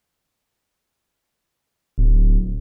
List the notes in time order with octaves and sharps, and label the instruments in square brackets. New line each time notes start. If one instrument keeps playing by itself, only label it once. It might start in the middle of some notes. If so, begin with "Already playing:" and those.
[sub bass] D1